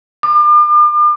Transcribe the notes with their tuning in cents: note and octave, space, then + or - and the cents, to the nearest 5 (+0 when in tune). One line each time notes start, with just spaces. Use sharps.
D6 +40